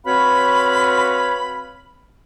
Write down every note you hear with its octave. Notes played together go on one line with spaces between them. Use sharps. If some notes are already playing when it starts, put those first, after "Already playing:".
C4 F#4 B4 C#5 F5 B5